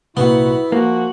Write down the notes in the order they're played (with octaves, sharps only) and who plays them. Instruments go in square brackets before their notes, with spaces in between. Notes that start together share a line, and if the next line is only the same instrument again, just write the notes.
[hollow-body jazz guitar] C2 A#2 [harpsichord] B3 [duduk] E4 [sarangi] F#4
[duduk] F3 [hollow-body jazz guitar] A#3 [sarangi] F#4